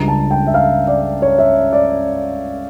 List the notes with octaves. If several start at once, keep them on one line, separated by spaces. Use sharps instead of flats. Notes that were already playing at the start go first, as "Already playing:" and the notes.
Already playing: C#2 C#3 G3 D4 A#5
A5
G5
E5
F5
D5
C#5
E5
D5